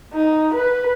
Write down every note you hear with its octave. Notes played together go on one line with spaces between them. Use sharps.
D#4
B4